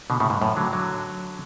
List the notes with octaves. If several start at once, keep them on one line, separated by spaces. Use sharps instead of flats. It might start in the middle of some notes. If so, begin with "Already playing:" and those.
B2 D3
A2 C#3
G#2
F#2 A2
D3 F#3
D3 F#3